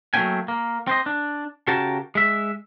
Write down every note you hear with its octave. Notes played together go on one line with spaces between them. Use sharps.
F#3 A3 A#3 C#4 G5 G#5
A#3
C4 C5 D#5
D4
C#3 F#4 G4 A#4 A5
G#3 E5